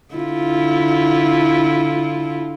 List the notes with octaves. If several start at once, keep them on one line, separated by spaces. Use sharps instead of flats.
D3 E4 F4